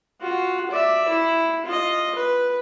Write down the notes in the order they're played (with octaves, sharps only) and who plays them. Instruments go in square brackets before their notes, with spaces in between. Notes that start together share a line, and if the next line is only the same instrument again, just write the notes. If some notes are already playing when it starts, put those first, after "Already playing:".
[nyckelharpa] F4 F#4
D5 E5
E4
F4 D#5
B4